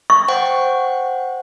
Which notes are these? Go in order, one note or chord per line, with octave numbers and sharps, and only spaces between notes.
C#6
C5 F#5 G5